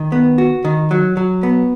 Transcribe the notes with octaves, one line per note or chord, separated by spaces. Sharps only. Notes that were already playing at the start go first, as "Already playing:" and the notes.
Already playing: D#3
B3
F#4
D#3
F#3
F#3
B3